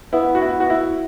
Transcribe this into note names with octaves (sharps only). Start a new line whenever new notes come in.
B3 E4
F#4
E4
F#4
E4